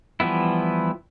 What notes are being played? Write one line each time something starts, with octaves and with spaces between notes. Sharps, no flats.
E3 F3 G3 B3 E4